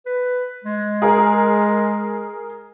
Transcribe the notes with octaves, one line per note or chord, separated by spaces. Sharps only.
B4
G#3
G#4 A#4